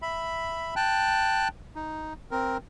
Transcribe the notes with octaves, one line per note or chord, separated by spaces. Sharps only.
E5 B5
G5 A5 F#6
D#4
C4 A#4